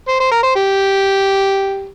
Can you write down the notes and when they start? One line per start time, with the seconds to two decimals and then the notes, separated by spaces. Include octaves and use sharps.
0.08 C5
0.20 C5
0.31 A#4
0.43 C5
0.55 G4